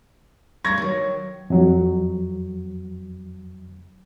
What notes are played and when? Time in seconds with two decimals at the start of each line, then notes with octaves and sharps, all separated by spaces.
0.64 G2 A3 C#6 G#6 A#6
0.78 D#3 F#3
1.50 F2 F#3